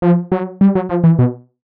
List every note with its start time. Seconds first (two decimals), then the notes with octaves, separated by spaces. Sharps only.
0.02 F3
0.32 F#3
0.61 G3
0.75 F#3
0.89 F3
1.04 E3
1.19 B2